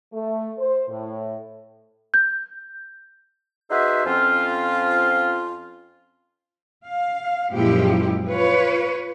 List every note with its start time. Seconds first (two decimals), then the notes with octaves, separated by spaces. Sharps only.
0.14 A3
0.58 C5
0.89 A2
2.14 G6
3.71 D#4 F#4 G#4 B4 C5 E5
4.05 F2 F3 C4 C#4 F4
6.84 F5
7.50 F#2 A#2 F3 G#3 E4 G4
8.27 F4 B4 C#5